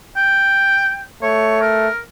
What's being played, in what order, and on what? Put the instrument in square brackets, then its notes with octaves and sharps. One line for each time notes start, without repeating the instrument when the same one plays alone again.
[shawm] G5
[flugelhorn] A3 [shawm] C#5
[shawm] A#4